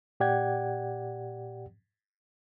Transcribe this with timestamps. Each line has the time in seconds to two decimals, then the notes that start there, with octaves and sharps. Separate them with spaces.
0.20 A#2 G4 D5 F#5 G5 G#6